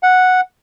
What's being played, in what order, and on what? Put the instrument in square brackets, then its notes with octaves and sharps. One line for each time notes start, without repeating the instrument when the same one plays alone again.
[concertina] F#5